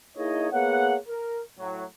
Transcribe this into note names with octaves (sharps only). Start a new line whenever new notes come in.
A#3 D#4 E4 G#4 C#5 D#5
A#3 B3 G#4 C#5 F#5
A#4
A2 F#3